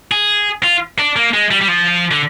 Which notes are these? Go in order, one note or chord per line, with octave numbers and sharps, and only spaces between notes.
G#4
F4
D4
A#3
G#3
G3
G3
F3
D3